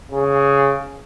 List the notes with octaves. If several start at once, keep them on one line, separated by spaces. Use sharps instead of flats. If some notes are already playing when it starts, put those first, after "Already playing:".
C#3